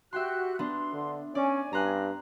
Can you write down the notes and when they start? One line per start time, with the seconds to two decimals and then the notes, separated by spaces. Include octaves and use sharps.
0.13 F#4 G4 E5 G5 C6 F#6
0.59 B3 D4 C6
0.93 D3
1.35 C#4 D5 G#5
1.73 G2 A#5 C6 F#6